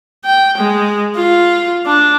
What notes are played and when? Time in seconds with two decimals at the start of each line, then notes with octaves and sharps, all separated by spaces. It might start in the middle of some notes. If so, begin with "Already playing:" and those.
0.25 G5
0.57 G#3
1.16 F4
1.86 D4